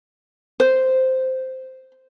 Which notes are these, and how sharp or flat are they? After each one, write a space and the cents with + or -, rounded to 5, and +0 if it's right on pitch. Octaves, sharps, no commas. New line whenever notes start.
C5 -5